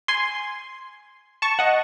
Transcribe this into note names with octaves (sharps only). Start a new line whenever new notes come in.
G#5 C6
A5 C#6
D#5 F#5